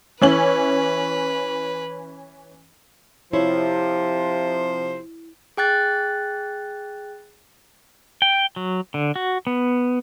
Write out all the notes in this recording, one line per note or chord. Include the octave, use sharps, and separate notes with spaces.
E3 C#4 B4 F#7
C3 F3 E4 C5 C#5
G#4 G5 F#6 A6
G5
F#3
D3
F#4
B3